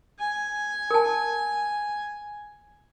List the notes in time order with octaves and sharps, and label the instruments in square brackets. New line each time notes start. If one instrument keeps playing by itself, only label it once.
[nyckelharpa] G#5
[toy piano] A#4 A5